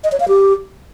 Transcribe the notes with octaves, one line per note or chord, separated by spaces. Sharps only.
D#5
C#5
F5
G4